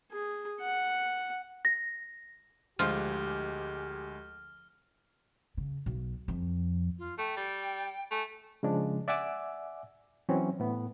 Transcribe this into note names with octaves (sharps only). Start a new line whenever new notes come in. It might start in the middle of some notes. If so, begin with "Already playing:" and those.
G#4
F#5
A#6
D2 F3 G#3 G4 F6
C#3
B1
F2
F4
A3 G5
G3
A3 G#5
C#3 F3 G#3 D4
D5 E5 F#5 G#5 D6 E6
E3 F#3 C4 C#4
A2 B3